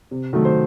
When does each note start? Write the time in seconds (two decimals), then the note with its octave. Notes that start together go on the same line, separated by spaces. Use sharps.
0.11 C3
0.33 D#3 F#3 A3
0.45 C5